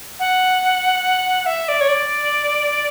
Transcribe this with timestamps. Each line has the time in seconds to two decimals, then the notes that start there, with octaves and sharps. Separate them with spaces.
0.19 F#5
1.46 E5
1.68 D5
1.81 C#5
1.88 D5